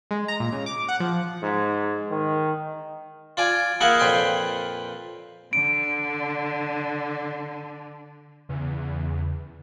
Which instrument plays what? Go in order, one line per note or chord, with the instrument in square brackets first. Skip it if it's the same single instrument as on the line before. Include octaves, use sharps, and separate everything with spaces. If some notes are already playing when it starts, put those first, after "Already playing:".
[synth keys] G#3
A#5
A#2
C#3
D6
F#5
F3
[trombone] G#2
D#3
[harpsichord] F4 D5 G#5
A#3 E4 G#4 D#5 F5 F#5
F2 A#2 B4 G5 C6
[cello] D3 [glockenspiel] D7
[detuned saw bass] E2 [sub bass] C#3